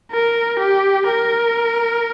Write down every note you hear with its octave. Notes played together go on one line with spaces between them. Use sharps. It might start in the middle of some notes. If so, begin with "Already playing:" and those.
A#4
G4
A#4